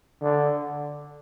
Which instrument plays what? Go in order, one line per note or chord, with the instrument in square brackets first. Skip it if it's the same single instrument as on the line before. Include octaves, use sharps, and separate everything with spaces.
[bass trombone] D3